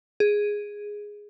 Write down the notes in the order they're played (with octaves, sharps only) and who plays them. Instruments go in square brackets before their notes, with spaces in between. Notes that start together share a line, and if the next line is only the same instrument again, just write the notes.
[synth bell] G#4